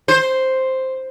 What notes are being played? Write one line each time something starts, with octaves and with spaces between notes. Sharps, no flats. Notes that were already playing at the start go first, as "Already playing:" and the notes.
C5